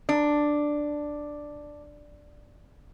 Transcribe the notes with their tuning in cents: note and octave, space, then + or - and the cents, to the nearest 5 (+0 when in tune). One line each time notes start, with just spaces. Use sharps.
D4 +5